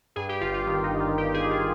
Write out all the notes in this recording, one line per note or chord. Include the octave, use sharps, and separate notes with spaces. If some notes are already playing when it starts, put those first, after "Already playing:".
G2 G#4
G4
G1 F4
F4
D#3 F4
D#4
G1
F4
G2 G4
G#4
G1
F4